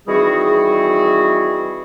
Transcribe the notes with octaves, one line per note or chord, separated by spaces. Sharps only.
D#3 E3 G3 C4 F#4 G#4